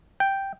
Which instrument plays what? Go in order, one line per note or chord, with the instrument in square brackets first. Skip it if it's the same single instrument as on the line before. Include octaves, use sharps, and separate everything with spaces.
[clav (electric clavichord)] G5